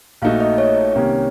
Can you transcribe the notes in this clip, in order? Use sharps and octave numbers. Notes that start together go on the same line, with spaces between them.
A#1 A#2 A3 D#4 F#4 F5
D#5
C#5
C2 C3 D#3 A#3 C#4